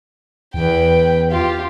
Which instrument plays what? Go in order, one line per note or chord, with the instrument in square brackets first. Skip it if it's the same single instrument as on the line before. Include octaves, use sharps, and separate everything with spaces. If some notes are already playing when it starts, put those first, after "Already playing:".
[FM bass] E2 [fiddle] B4 G5
[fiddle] F4 G4